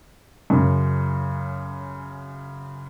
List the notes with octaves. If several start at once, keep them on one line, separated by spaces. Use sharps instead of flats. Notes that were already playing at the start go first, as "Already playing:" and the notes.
F#2 C#3